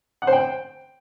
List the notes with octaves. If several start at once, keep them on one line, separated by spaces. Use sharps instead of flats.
F#5
C5
G5